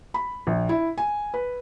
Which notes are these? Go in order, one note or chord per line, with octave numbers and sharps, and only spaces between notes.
B5
A#1
E4
G#5
B4